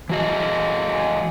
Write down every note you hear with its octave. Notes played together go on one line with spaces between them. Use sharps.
E3 F#4 D#5